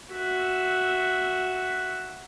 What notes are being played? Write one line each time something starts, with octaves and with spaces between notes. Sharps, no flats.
F#4 E5